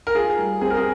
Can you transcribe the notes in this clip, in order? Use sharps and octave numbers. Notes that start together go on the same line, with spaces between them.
A#4
F4 G#4
G3
C4 G#4
A#4
G#4